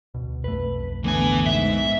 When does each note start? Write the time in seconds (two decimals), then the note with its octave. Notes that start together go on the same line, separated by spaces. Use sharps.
0.14 D2 B2
0.44 B1 F2 A3 B4
1.04 A2 D3 E3 B3 G#5
1.46 G#2 E5